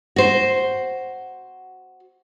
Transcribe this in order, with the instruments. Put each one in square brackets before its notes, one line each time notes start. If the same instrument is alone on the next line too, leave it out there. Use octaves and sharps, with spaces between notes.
[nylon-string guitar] F#4 C5